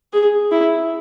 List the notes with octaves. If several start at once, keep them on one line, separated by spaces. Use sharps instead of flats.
G#4
E4